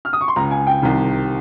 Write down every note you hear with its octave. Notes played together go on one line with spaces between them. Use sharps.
F6
D#6
C#6
C6
C#2 C#3 A#5
G#5
G5
C2 C3 D#3